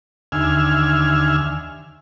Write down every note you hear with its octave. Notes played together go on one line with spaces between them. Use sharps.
D#2 D3 E5 G#5 F6